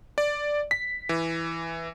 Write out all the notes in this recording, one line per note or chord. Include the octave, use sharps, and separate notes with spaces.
D5
B6
E3